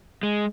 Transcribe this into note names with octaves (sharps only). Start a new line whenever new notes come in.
G#3